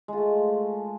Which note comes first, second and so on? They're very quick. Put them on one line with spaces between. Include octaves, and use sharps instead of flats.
G#3 F4 A3